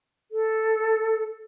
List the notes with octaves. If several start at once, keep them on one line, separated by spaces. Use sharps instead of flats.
A4